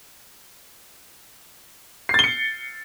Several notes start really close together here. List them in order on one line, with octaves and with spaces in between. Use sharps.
C7 A6 G7 C#7